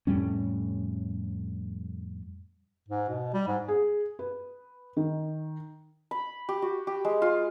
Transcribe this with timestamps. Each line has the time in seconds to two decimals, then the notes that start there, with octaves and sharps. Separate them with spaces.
0.07 F2 A2 G3 C#4
2.89 G#2
3.09 B2
3.34 G3
3.48 G#2
3.68 G#4
4.19 B4
4.97 D#3
6.11 B5
6.49 G4
6.62 F#4
6.87 G4
7.05 G#3
7.22 F4